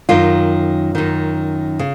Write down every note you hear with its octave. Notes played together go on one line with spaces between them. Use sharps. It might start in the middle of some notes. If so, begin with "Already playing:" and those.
F#2 D#3 F4
F#2 D#3
C#3